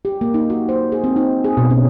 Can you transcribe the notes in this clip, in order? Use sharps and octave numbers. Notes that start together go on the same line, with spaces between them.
G4
A#3
D#4
F#4
C5
G#4
C4
D#4
G#4
B2
C#4